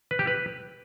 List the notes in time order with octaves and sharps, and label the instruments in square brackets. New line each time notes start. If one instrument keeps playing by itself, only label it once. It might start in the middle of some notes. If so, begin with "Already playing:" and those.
[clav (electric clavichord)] B4
G4
B4